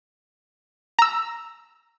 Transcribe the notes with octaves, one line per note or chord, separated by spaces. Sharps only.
A#5 E6